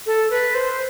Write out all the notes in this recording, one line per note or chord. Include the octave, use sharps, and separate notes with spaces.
A4
B4
C5